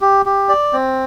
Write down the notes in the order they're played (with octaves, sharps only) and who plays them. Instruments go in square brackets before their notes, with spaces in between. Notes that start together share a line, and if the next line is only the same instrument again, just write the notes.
[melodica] G4
G4
D5
C4